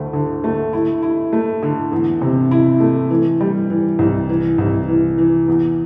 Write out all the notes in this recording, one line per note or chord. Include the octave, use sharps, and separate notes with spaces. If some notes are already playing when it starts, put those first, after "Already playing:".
Already playing: D2 A3
D3
A3
E4
E4
A3
D3
E2
C3
E4
A3
E3
G3
E3
C2
E3
C2
E3
E3
E2